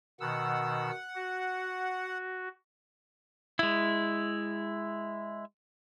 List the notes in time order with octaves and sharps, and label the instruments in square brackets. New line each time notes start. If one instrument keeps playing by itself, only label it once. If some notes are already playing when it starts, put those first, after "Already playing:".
[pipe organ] B2 D#3 E6 [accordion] F#5
[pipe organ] F#4
[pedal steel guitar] G#3 E4